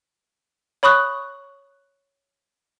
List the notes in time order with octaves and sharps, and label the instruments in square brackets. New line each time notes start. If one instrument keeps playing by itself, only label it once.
[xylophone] C#5 B5 C#6 D#6 F#6